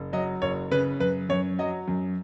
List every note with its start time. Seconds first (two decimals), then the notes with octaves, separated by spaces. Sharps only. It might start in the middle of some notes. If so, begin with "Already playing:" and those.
Already playing: F#1
0.13 F#3 D#5
0.42 F#1 C#5
0.71 C#3 B4
1.00 F#2 B4
1.29 F#2 C#5
1.59 F#3 D#5
1.88 F#2